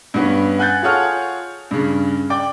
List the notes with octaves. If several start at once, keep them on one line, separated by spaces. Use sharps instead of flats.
G2 B3 C#4
F#5 G#5 F#6 G6 A6
F4 G#4 A4 C#5 F#5 F6
G2 C#3
D5 G5 D6